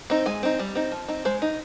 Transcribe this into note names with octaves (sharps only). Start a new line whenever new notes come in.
C4 D#4
G#3 G#5
C4 D#4
G3
C4 D#4
F3
C4 D#4
G#3 C5
D#4